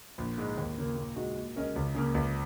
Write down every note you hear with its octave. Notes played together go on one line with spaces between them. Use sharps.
A#1
G#2 G#3
D#2
C#3 A#3
A#2
G#3 D#4 F#4 D#5
A#2
G#3 C#4 A#4 D#5
C#2
C#3 A#3 C#4
C#2